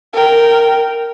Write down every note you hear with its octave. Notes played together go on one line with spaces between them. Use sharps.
A#4 G5